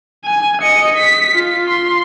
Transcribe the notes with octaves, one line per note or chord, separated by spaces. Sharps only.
G#5
D#5 C#7
B6
F4
C6